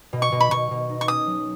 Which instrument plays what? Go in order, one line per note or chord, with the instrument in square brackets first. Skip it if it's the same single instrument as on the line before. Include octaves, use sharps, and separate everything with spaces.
[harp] B2
[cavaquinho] C#6
[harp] B2
[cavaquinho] B5
[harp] B2 [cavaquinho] C#6
[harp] B2
D#4
[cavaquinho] C#6
[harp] C#4 [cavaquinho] D#6
[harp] F#3